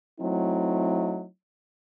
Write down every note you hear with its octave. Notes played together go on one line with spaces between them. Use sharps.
F#3 A3 C4 D#4 E4